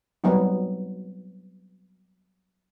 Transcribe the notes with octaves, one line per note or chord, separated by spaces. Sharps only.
F#3 G3 B3 C4 D#4